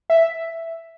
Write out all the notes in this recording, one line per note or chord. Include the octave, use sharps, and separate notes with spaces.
E5